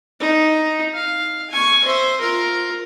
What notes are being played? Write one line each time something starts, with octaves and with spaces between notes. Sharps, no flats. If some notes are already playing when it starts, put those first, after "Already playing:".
D#4
F5
G#5 C#6
C5 E5
F4 A#4